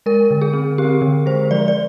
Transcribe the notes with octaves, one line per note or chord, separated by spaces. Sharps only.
G#3 A#4
D3
G#4
C4
C4 G4
D3
G#3 C5
F3 D5
D5